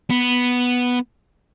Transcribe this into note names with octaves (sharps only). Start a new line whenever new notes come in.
B3